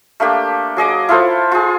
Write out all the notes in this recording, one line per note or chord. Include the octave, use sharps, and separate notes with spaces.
A3 A#3 D4 G4
F#3 G#4 D#5 D6
E4 F4 A4 C5
F4 G#4